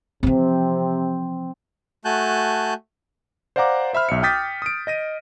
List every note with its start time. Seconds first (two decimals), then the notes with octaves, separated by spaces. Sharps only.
0.23 C3 E3 F3 C4
2.05 A3 F#4 G#5 A5 F#6 G6
3.56 C5 D5 F5 F#5 A#5 D6
3.93 C5 E5 B5 F6
4.09 B1 E5 C#7
4.23 G5 D6 D#6 G6 A6 B6
4.62 D#6 D7
4.87 D#5 A#6 D#7